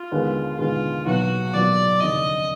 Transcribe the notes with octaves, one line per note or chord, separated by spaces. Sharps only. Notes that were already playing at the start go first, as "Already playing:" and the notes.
Already playing: F4
D#2 D3 G#3 B3
D#2 D3 G#3 B3 F4
B1 A#2 F#3 B3 F#4
B1 A#2 F#3 B3 D5
F1 D#2 D3 D#5